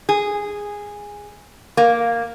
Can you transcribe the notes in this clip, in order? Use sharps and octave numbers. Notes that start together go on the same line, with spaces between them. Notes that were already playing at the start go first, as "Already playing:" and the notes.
G#4
A#3